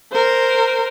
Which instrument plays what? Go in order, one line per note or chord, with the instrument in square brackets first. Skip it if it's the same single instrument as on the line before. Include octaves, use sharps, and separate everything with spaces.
[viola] A#4 C5